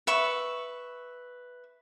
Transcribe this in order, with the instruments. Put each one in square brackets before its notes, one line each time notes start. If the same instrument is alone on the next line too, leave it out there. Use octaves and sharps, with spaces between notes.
[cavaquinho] B4 E5 C#6